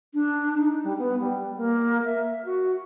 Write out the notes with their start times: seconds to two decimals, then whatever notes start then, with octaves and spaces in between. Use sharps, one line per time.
0.14 D4
0.57 D#4
0.84 G3
0.99 B3
1.20 G3
1.57 A#3
2.05 E5
2.45 F#4